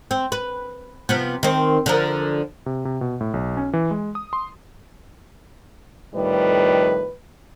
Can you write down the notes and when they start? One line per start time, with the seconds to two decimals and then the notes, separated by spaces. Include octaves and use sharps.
0.11 C4
0.32 B4
1.09 C3 F3 B3
1.43 D#3 C4
1.86 D3 F3 A#4
2.66 C3
2.85 C3
3.01 B2
3.21 A2
3.34 B1
3.57 C#4
3.73 E3
3.91 G#3
4.15 D#6
4.33 C6
6.14 F2 A2 D#3 G3 B4